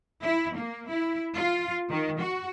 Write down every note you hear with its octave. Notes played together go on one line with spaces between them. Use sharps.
E4
A#3
E4
F4
D#3
F#4